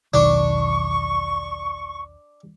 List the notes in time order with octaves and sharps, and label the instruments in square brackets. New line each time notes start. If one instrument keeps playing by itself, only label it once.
[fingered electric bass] E1 B1 D#3 [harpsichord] D4 [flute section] C#6